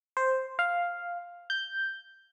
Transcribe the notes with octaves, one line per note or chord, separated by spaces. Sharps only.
C5
F5
G6